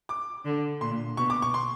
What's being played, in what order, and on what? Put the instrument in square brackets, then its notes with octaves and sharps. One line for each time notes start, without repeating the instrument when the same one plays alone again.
[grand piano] D6
[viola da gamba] D3
[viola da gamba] A#2 [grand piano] C6
[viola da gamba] B2 [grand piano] C#6
[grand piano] D6
C#6
C6